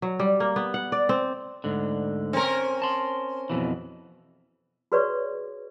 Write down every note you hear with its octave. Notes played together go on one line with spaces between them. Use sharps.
F#3
G3
A#3
B3
F#5
D5
C4
D2 G#2 D3
C4 C#4 A#4
A5 C6
F2 B2 E3
F#4 G#4 B4 C#5 D5 C#6